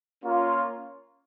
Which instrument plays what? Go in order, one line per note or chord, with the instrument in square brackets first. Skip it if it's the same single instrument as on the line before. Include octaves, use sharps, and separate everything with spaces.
[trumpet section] A#3 C#4 F4